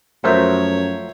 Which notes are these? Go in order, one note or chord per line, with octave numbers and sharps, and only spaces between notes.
F#2 F3 F#3 A3 A#4 C5 C#5 E5